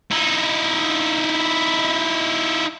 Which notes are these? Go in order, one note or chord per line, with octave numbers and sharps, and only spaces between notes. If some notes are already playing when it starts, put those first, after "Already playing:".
D#4 E4